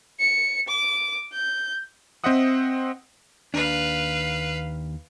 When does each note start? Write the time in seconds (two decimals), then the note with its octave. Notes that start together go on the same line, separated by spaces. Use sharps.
0.20 C#7
0.68 D6
1.33 G6
2.24 C4 C5 D#5 E5 F#5 D#6
3.54 D#2 D4 B4 F5